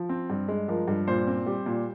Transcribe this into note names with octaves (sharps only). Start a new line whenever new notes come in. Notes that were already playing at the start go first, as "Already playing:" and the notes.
Already playing: F3
C4
G2
G#3
F3 A#4
G2
A#2 C5
C4
G3
A#2